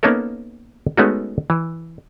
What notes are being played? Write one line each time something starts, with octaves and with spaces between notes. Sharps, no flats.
A#3 B3 C#4 D#4 A4 A#4
G#3 A3 B3 C#4 D#4 F#4
E3